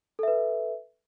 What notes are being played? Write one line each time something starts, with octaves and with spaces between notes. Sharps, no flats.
A4 B4 E5